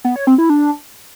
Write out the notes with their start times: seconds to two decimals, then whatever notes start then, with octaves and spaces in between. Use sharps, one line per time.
0.05 B3
0.16 C#5
0.27 C4
0.38 E4
0.50 D4